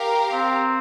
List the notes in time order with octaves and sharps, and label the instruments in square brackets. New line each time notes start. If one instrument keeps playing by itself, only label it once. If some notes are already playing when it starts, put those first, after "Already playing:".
Already playing: [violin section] G4 A#4 F5
[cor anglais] C4